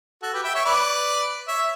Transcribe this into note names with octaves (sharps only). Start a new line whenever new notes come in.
F#4 A4
G4 B4
E5 G5
C#5 E5
B4 D5
C#5 E5